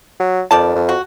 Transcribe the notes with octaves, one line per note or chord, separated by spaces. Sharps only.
F#3
F2 D#3 D5 A5
F2
F#4